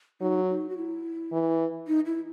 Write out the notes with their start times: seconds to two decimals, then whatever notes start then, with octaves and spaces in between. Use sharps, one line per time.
0.21 F#3 D#4
0.50 D#4
0.69 F#4
0.77 E4
1.32 E3
1.87 D#4
2.06 E4